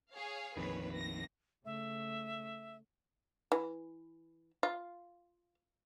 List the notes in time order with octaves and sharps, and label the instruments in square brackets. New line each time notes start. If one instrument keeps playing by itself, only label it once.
[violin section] G#4 C#5 F5
[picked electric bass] A#1 F2 D#3 [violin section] B4 C#5
[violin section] A#6
[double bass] C#3 A3 [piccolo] E5
[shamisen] E3
F4